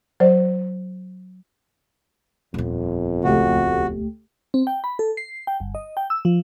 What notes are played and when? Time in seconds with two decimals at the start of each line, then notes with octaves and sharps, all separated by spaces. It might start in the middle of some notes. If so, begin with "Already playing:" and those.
0.20 F#3 C5 D5
2.54 D#1 F2 B3
3.24 C#2 A3 F#4 G4
4.54 C4
4.67 G5
4.84 B5
4.99 A4
5.17 C7
5.47 G5
5.60 G1
5.75 D#5
5.97 G5
6.10 E6
6.25 F3